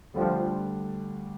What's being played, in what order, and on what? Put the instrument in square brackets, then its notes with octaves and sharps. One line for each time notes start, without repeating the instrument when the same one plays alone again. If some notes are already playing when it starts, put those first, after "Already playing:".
[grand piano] D2 D3 G3 D4 [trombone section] F3